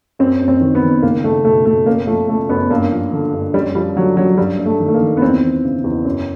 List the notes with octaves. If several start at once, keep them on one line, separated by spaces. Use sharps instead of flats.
F#2 C4
F#2
C4
D#3
B3
D#3
C#2 A#3
C#2 A3
B2 A3
B2 A3
F#2 A#3
F3 A3
C#3 A3
F#2 B3
G2 A#3
F3
D3
G2
F#2 G3
F3 G3
D3 F#3
F#2 F#3
G2 G3
G2
A3
D#3
A3
A#3
D#3
B3
E2 C4
E3
C#3
E2
F#2